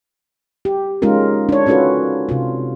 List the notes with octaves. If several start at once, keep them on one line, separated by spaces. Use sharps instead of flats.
G4
G#3 C#4 D#4 F4 A#4
D4 C#5
C#4 D#4 F4 F#4 A4 B4
C3 F4